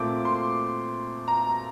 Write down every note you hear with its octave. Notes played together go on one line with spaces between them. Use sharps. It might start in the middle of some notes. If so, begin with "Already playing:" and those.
Already playing: A#2 A3 C4 D6
C6
A#5